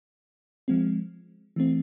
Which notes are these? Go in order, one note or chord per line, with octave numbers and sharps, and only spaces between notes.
F3 G#3 C4
E3 A3 C4